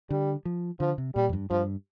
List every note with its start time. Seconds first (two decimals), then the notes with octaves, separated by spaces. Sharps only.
0.10 D3 G3
0.45 F3
0.80 D3 F3
0.98 C3
1.15 A#2 G3
1.29 F2
1.33 G2
1.50 G2 F3